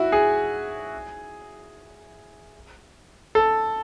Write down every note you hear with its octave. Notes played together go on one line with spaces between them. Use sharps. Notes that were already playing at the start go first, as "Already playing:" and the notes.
Already playing: E4 F#4
G#4
A4